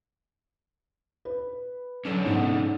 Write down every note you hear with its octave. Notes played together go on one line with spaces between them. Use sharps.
B4
F#3 C#4 D4 A4
G#2 B3